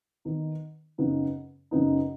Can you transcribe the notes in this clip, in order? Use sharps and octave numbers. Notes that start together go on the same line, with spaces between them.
D#3 B3 D#4
F#2 C#3 B3 D#4
F#2 C#3 B3 D#4